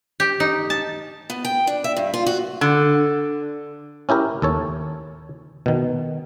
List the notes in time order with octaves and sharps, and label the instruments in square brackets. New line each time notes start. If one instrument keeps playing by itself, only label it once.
[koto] G4
D#4
A5
[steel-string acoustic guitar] B3
G5
D4
E5
G2
F4
F#4
[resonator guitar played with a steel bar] D3
[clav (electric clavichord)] C#4 E4 G4 A#4
D#2 A4 C#5
B2 D#3